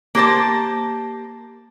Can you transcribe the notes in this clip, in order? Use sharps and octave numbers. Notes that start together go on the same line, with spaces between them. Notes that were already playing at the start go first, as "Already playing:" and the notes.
A#3 G4 C5 A5